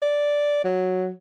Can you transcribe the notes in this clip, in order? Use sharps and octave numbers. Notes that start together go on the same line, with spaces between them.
D5
F#3